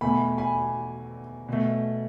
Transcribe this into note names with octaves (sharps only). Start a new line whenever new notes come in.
E2 B2 A3 G#5 B5
G#5 B5
B2 A3